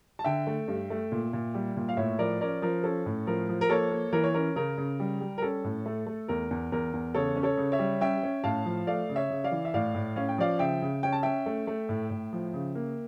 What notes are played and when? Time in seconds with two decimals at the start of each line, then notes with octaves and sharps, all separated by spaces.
0.19 A5
0.24 D3 E5 G5
0.47 A3
0.68 G2
0.90 A3
1.12 A#2
1.33 A#2
1.54 G3
1.77 A#2
1.89 F5
1.97 A2 C#5 E5
2.19 F3 A#4 D5
2.41 C#4 A#4 D5
2.62 F3 A#4
2.84 C#4 A4
3.06 A2
3.27 F3 A#4
3.49 F3
3.61 A#4
3.69 A#3 A4 C#5
3.91 A#3
4.13 E3 A#4
4.24 C#5
4.34 C#4 A#4
4.56 C#3 A#4
4.78 C#3
5.00 G3
5.21 G3
5.38 A#4
5.42 C#4 A4
5.64 A2
5.86 A3
6.07 A3
6.28 E2 A#4
6.51 E2
6.72 E2 A#4
6.93 E2
7.14 C#3 A4 C#5
7.36 C#4
7.43 A4 C#5
7.57 C#3
7.72 C#5 E5
7.79 G3
8.01 C#4 E5 G5
8.23 C#4
8.44 A2 F5 A5
8.65 F3
8.87 A3 D5 F5
9.09 C#3
9.16 C#5 E5
9.30 C#3
9.44 D5 F5
9.51 E3
9.65 E5
9.74 A2 D5 F5
9.95 A2
10.16 C#4 F5
10.29 G5
10.38 F3 D5 F5
10.59 C#3 E5 G5
10.82 C#3
11.03 C#4 G5
11.12 A5
11.23 C#4 E5 G5
11.46 A3
11.67 A3
11.89 A2
12.10 A2
12.33 F3
12.54 C#3
12.75 A#3